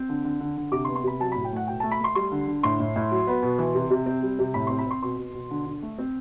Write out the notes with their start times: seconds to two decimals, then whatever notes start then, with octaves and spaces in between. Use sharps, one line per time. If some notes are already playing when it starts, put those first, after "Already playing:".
Already playing: C4
0.09 D3
0.24 D3
0.40 D3
0.57 D3
0.72 C3 D6
0.85 C6
0.88 B3
0.96 C6
1.04 C3 B5
1.20 F#3 A5
1.32 B5
1.36 A2
1.45 G5
1.52 A3 F#5
1.68 B2 G5
1.80 A3 A5
1.91 B5
2.00 A3 C6
2.15 G3 C6
2.32 D3
2.48 D3
2.63 A2 C6
2.80 A2
2.96 A2
3.11 F#3
3.27 B3
3.43 B2
3.59 E3
3.75 C3
3.90 C3
4.06 C4
4.23 G3
4.39 C3
4.54 A2 B5
4.67 C4 C6
4.79 B5
4.87 C4 C6
5.03 B2 C6
5.18 B2
5.34 B2
5.51 D3
5.66 D3
5.82 A3
5.98 C4